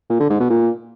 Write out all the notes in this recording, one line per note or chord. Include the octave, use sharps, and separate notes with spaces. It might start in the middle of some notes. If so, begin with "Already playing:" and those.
A#2
D3
G#2
B2
A#2